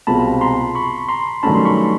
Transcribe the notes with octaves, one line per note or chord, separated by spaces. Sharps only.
C2 B2 G#3 C4 F4 A5 B5
A#5 C6
B5 C#6
A#5 C6
G2 D#3 F#3 A3 C#4 A5 B5
C6
B5 C#6